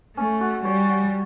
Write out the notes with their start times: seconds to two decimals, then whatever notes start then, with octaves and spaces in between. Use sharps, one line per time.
0.17 A3 C#4
0.41 F#4
0.65 G3 C#5
0.89 F#4